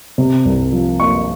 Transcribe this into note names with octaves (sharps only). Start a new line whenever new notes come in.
C3
C2
F3
A#3 C#6